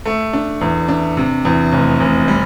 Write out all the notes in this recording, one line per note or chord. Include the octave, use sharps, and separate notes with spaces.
A3
D4
E2
D4
C3
E2
F1
F1
G3